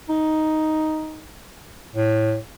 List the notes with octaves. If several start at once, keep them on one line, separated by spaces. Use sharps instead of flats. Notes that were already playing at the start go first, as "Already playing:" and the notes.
D#4
A2